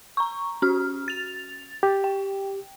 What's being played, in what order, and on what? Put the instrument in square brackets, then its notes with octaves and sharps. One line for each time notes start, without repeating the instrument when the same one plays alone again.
[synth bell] A#5 C#6
C#4 F#4 F6
A6 F7
[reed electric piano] G4
[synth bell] G5